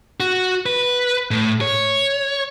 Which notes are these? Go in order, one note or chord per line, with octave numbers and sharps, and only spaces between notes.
F#4
B4
A2
C#5